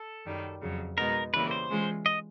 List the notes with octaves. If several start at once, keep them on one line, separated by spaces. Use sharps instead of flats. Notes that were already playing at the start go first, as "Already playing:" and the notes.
Already playing: A4
F#2 D#3 G3
F2 C#3 F#3
B2 G#3 B3 D#4 A#4
C#3 E3 G3 A#3 B4
C5
E3 G#3 C#4 F4
D#5